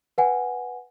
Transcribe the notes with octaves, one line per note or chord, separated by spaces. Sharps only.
B4 F#5 G#5